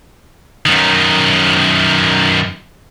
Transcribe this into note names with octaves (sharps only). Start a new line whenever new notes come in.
F#2 D#3